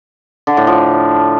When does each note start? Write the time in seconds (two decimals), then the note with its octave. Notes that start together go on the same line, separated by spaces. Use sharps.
0.47 D3
0.57 A2
0.67 F3